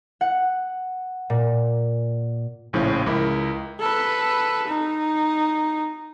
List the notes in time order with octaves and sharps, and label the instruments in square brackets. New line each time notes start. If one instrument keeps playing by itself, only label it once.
[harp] F#5
A#2
[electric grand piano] A#1 A2 C#3 F3 C#4 F4
C#2 E4 A#4
[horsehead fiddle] A4 B4
D#4